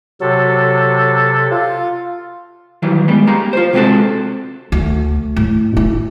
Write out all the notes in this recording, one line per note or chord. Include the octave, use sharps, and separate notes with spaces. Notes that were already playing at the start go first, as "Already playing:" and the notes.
C3 F#3 A4
F4
D#3 E3 F#3 G3
G3 G#3 B3
A#3 G4 A#5
F4 C5
C3 G#3 B3 C4 F#4 A4
D2
A2
E4